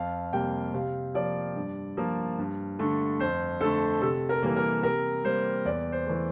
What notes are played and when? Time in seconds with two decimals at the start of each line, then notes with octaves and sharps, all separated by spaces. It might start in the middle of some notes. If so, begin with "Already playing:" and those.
Already playing: F2 F5
0.33 C3 G3 A#3 G5
0.74 C3 F5
1.15 F3 A#3 D5
1.56 G2
1.97 F3 A#3
2.38 G2
2.79 D3 A3
3.19 F2 C5
3.60 D3 A3 A4
4.02 C3 A4
4.29 A#4
4.43 E3 G3 A#3
4.56 A#4
4.83 C3 A#4
5.25 G3 A#3 C5
5.65 E2 D5
5.92 C5
6.06 E3 A3